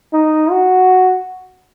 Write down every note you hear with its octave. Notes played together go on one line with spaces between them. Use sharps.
D#4
F#4